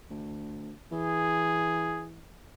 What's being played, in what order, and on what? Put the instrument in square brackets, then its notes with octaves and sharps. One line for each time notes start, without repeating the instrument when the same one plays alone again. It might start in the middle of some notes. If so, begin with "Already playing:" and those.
[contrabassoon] D2
[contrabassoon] E3 [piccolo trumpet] G#4